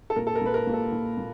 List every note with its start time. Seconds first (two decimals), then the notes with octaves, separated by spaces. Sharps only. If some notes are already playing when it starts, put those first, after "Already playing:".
0.10 A4
0.16 A#2 A#4
0.27 A4
0.35 A#4
0.42 A#2 B4
0.54 A#4
0.67 A#2
0.73 A4
0.92 A#2
1.18 A#2